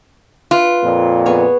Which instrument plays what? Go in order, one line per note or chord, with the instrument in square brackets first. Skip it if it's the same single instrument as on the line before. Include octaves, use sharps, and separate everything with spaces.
[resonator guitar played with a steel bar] F4 [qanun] B4
[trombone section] F2 A#2
[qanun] B3 G#4 C#5